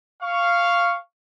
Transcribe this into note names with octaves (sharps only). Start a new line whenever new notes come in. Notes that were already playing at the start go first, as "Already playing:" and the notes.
F5 C#6